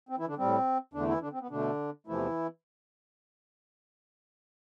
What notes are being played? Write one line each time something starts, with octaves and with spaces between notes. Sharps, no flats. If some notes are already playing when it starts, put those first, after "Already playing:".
C4
E3 E4
D3 D4
A2 G3 C4
E2 D3 A3 D4
E3 E4
D3 D4
C4
B3
B2 D3 A3 D4
E2 C3 E3 F3 A3 E4